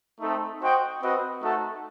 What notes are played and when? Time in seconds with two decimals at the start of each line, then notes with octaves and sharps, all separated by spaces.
0.20 A3 C4 D#4 A4
0.60 F#4 C5 D#5 G5
1.01 C4 F#4 B4 D#5
1.41 A3 D#4 F#4 A4